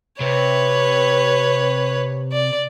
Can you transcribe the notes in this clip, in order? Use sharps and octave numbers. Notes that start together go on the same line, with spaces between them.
C3 B4 C#5
D5